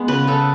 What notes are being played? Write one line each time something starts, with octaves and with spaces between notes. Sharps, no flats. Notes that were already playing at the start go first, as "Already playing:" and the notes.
Already playing: G#3 B3 G#4
C#3 B4
C#3 A4